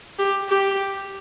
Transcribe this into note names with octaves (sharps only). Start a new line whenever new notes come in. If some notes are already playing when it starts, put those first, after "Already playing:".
G4
G4